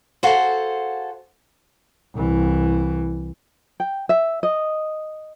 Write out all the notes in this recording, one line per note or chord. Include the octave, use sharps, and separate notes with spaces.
F#4 G#4 A4 C5 F5 F#5
C2 E3
G5
E5
D#5